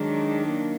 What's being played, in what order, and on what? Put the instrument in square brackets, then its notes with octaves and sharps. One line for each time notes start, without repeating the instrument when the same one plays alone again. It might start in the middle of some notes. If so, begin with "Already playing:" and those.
Already playing: [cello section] D#3 F#3 D4 [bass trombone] G#3
[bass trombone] A#3